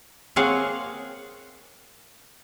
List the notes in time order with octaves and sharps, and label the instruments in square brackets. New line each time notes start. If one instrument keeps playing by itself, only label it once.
[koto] A#3 C4 G#4 C#5 F5 F#5